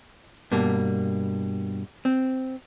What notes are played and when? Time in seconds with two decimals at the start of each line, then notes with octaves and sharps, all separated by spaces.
0.52 G2 B2 A#3
2.05 C4